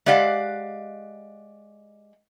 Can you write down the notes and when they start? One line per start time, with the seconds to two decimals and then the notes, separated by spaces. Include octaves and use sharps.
0.06 G#3 G4 D5 F5 F#5